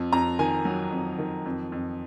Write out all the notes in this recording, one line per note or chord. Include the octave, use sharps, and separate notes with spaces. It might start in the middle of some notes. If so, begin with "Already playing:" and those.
Already playing: F2
F2 A#5
D#3 G#5
F#3
F2
D#3
F2
F2